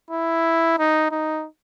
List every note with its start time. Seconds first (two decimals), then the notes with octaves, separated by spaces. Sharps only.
0.11 E4
0.78 D#4
1.11 D#4